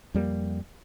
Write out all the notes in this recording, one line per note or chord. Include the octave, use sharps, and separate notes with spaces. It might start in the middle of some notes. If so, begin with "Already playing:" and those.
F2 G3 G#3 A#3